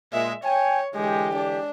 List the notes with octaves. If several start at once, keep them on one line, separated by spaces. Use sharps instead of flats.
A#2 G#3 E5
C#5 G5 G#5
D3 E3 G#3 G4
D4